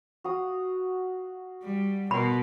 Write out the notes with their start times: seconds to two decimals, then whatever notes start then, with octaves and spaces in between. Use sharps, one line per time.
0.24 F#4 F5 D#6
1.63 G3
2.11 B2 A#4 B5 C6